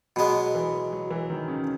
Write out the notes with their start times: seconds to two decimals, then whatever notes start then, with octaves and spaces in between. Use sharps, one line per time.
0.16 B2 F#3 G#3 B3
0.55 E3
0.92 F#3
1.11 E3
1.30 D#3
1.48 C#3